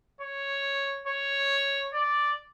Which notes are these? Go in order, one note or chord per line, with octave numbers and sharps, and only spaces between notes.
C#5
C#5
D5